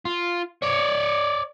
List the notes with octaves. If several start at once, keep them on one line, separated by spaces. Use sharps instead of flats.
F4
C#5 D5